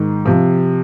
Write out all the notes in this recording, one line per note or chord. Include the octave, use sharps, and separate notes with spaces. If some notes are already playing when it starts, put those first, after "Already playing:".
Already playing: G#2 D#3
C3 F3